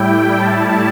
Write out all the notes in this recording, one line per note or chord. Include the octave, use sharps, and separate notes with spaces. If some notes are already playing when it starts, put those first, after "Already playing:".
Already playing: A2 G3 E4 G5
A5